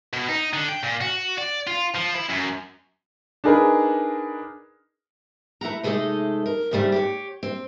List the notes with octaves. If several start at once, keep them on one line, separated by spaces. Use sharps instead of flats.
B2
D#4
D3
G5
A#2
F#4
D5
F4
F3
E4
F#2
D4 D#4 G#4 A#4 B4
A3 E4 F#5 A#5
C3 G#3 A3 D#4 A4 D#5
A#4
G#2 C#3 F3 G3 A3
G4 A#4 C#5
C4